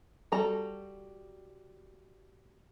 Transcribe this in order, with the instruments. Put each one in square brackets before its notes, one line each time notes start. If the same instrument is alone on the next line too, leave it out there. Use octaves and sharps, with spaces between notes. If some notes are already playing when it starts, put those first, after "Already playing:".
[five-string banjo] G3 F#4 A4 A#5